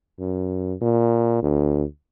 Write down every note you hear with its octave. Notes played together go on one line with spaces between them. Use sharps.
F#2
A#2
D2